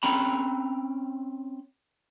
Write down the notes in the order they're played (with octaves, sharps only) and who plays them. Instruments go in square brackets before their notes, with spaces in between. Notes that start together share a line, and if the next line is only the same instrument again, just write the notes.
[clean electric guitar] C4 C#4 G5 A#5 B5